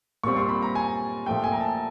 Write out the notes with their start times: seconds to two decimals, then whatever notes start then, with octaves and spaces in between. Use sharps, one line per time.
0.23 A#2 G3 C4 C#6
0.37 C6
0.49 B5
0.62 A#5
0.75 G#5
1.26 A#2 F3 A3 G5
1.44 G#5
1.52 A#5
1.61 A5